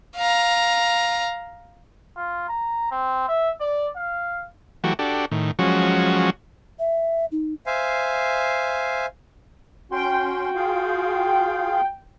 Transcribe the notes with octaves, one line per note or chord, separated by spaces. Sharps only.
F5 A#5
F4
A#5
C4
E5
D5
F5
E3 F#3 A3 F#4 G4
D4 F#4 G4 A4
A2 D#3
F3 F#3 G#3 C#4 F#4
E5
D#4
C5 E5 F5 G#5
C#4 F#4 G5 C6
F4 G#4 F5